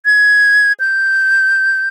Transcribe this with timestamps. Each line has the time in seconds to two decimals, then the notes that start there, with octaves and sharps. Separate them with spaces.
0.05 G#6
0.80 G6